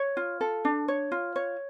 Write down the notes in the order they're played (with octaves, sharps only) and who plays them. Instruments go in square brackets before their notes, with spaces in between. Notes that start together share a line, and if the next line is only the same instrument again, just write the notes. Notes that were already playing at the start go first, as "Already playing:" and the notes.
Already playing: [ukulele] C#5
F4
A4
D4
C#5
F4
C#5